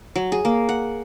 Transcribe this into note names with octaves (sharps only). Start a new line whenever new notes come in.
F#3
G#4
A#3
F#5